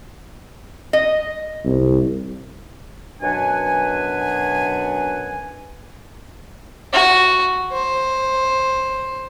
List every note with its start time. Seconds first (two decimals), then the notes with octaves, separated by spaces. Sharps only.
0.93 D#5
1.64 C2
3.22 F#2 B2 D4 B4 F#5 G#5
6.93 F#4
7.72 C5